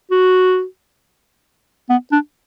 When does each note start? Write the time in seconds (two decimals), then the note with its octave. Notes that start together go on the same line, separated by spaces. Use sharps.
0.11 F#4
1.89 B3
2.12 D4